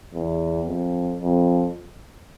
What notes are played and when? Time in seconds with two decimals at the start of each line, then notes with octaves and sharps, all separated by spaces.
0.14 E2
0.66 F2
1.19 F2